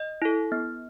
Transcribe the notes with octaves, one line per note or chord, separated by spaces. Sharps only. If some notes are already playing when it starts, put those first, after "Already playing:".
Already playing: D#5
E4 A4
B3